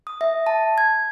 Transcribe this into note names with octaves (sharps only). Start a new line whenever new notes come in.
D#6
E5
A5
G#6